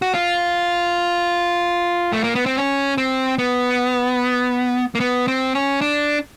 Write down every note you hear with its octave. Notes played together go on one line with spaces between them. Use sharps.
F#4
F4
A3
A#3
B3
C4
C#4
C4
B3
A#3
B3
C4
C#4
D4